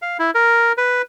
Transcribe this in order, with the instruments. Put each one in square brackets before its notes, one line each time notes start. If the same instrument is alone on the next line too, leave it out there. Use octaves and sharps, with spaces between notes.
[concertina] F5
E4
A#4
B4